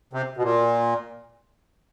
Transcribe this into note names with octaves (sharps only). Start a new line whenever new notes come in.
C3
B2
A#2